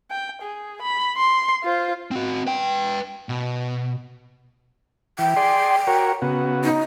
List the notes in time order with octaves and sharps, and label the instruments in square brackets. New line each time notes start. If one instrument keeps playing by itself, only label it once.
[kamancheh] G5
G#4
B5
C6
F4 C5
[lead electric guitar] C4 F#4
B4 G5
B2
[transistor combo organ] E3 [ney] G5
[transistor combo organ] G#4 D5 C6
F#4 A#4 C#5
C#3 B3 F#4
[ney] D#4